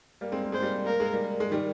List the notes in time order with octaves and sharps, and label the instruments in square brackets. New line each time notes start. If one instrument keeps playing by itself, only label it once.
[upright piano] G3 A#3
G#3 C4
A#3
[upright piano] G#3 [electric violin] C5
[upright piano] G3 A#3
[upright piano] A#3 [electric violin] A#4
[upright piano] G#3
G3 A#3
G#3
D#3 G3